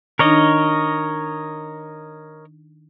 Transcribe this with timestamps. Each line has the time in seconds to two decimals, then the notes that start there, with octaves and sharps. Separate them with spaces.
0.19 D#3 D4 D#4 A#4 C#5 D#5